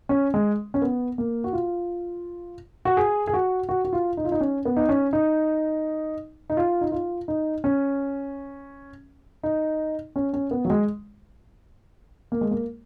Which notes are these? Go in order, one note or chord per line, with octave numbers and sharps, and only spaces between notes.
C#4
G#3
C#4
B3
A#3
F#4
F4
F#4
G#4
G#4
F#4
F#4
F#4
F4
D#4
F4
D#4
C#4
B3
D#4
C#4
D#4
D#4
F4
D#4
F4
D#4
C#4
D#4
C#4
C#4
B3
F#3
G#3
A#3
G#3
A#3